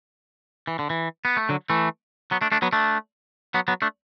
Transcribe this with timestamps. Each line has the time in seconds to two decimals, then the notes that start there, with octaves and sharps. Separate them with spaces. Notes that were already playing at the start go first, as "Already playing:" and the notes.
0.67 E3
0.79 D3
0.90 E3
1.25 B3
1.37 A3
1.49 D3 F#3
1.70 E3 A3
2.31 F#3 B3
2.41 A3 D4
2.52 A3 D4
2.62 F#3 B3
2.73 A3 D4
3.54 F#3 B3
3.68 F#3 B3
3.82 A3 D4